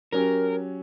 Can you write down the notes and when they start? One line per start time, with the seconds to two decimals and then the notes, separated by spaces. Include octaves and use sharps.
0.12 F#3 C#4 G4 A#4